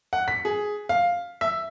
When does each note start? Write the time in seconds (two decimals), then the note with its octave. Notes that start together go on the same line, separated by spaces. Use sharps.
0.13 F#5
0.28 B6
0.45 G#4
0.89 F5
1.41 E5